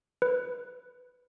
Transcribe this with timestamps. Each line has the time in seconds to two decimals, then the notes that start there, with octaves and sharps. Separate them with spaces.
0.22 B4